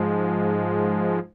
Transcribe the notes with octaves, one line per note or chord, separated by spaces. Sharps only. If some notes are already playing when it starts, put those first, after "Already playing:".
Already playing: G#2 F3 G#3